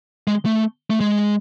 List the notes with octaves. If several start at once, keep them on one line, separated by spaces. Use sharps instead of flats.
G#3
A3
A3
G#3